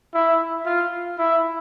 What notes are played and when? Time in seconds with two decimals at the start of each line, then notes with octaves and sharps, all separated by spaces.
0.14 E4
0.66 F4
1.18 E4